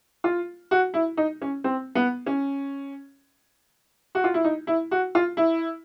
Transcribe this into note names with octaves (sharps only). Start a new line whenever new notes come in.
F4
F#4
E4
D#4
C#4
C4
B3
C#4
F#4
F4
E4
D#4
E4
F#4
F4
E4